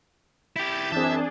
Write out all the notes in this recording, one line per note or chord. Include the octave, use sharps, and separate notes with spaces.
E4 G4 G6 A6
F#2 E3 C4 D4 G#4 E5 A5